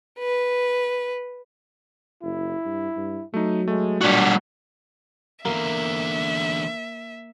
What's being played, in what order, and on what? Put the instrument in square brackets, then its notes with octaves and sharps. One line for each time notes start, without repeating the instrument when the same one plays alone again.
[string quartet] B4
[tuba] F#1 [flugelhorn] E4
[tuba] G2
G2
[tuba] F#3 [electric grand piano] A3 D#4
[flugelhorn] G#3 [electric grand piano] A3
[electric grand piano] B1 A#2 F#6 [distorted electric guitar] G3 F#4 [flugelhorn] D4
[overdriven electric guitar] E2 D3 [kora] A#3 [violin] E5